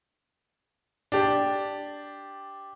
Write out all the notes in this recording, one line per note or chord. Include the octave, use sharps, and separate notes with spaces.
D4 G4